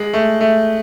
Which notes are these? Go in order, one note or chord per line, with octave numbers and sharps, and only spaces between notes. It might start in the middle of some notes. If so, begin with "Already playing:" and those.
Already playing: G#3
A3
A3